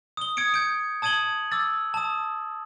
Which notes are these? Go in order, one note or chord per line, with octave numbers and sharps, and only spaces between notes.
D#6 G7
D#6 G#6 C#7 D7
G6 D7
A5 D#6 G#6 D#7 F#7 G7
D6 E6 A6
A5 D#6